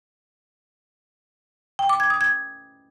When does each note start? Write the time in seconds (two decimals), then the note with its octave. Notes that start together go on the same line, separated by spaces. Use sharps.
1.79 G5
1.89 D6
2.00 G#6
2.10 D#6
2.21 G#6